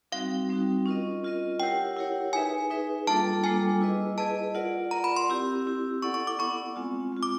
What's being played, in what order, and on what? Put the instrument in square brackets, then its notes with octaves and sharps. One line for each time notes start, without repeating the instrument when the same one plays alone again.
[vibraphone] G3 C4 D#4 F#4 [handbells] F5
[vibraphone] G3 C4 D#4 F#4
C#4 F4 A#4 D#5
C#4 F4 A#4 D#5
[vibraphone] E4 G4 A#4 C#5 F#5 [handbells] G5
[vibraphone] E4 G4 A#4 C#5 F#5
[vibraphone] D#4 G#4 B4 E5 [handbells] G#5
[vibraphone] D#4 G#4 B4 E5
[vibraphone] G3 A#3 D4 F4 A4 [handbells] A5
[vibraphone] G3 A#3 D4 F4 A4 [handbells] G#5
[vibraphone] E4 G#4 B4 D#5
[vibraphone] E4 G#4 B4 D#5 [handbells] A5
[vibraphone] F4 A#4 D5 F#5
[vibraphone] F4 A#4 D5 F#5 [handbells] A#5
[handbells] B5
C6
[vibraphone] C4 E4 G4
C4 E4 G4
[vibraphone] B3 E4 A4 D5 F#5 [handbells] C#6
[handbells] C#6
D6
[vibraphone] B3 E4 A4 D5 F#5 [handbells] C#6
[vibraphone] G#3 C4 F4
G#3 C4 F4
[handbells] D6